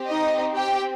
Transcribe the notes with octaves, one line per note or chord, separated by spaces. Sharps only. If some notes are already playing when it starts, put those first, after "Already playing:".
Already playing: C4 G4
D#4 D#5
G4 G5